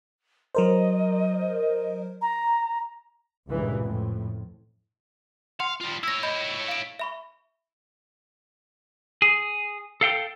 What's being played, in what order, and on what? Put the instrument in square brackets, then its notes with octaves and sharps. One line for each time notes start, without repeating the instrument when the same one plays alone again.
[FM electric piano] F#3 A#4 C5 [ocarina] D#5
[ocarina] A#5
[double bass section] C#2 G2 A#2 C#3 E3
F2 A2
[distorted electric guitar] F5 [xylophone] F#5 C6 C#7
[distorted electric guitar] G3 F4
[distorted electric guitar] E4 C#5 [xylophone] E6 A#6
[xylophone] D#5 B5 G6
F5 D7
E5 B5 C#6
[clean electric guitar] G#4
A4 F5 G5